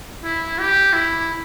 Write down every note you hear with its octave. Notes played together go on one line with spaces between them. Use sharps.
E4
G4
E4